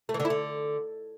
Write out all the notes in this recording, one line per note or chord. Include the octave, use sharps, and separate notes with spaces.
A3
E3
D3
E4
D3